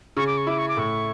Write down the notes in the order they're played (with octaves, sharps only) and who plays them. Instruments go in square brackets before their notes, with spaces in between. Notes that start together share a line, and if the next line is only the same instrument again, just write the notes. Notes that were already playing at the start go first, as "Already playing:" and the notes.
[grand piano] C#3 [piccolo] C#6
[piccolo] D6
C#6
[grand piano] E4 [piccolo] D6
[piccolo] C#6
D6
[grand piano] A2 [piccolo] C#6